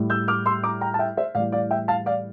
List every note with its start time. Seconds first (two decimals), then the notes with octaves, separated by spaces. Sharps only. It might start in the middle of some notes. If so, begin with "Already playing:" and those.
Already playing: A2 G3
0.10 E6 G6
0.28 D6 F6
0.46 C6 E6
0.64 A#5 D6
0.81 G5 A#5
0.94 A5
0.99 E5 G5
1.17 C5 E5
1.35 A2 E3 G3 D5 F5
1.52 D5 F5
1.71 E5 G5
1.88 F5 A5
2.06 D5 F5